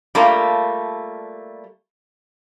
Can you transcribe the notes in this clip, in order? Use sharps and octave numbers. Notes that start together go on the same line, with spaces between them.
G3 A3 A#3 F4